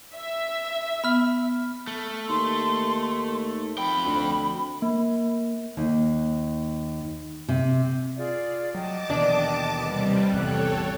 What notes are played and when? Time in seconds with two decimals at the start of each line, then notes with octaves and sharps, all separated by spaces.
0.15 E5
1.04 B3 B5 F6
1.87 A3
2.29 D#2 C6
3.78 F2 G5 B5
4.05 D2
4.82 A#3
5.77 D#2
7.49 C3
8.17 F4 G#4 D5
8.75 F#3 D#5 G5 A5 D6
9.10 D#2 B2 E3 D4
9.76 C3 G3 B4 D#5
10.32 A1 E2 A4 C#5 G5 F#6